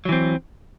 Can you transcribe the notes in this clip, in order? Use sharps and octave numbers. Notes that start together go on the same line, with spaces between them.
E3 F#3 C4